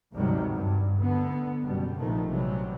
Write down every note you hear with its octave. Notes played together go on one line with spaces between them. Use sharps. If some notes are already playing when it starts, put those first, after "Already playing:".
G#1 D2 C3 D#3 F#3 G3
G2
D2 D3 B3
F#1 B2 G3
A#1 C3 D#3 F3 A3
C3 E3 F#3 G3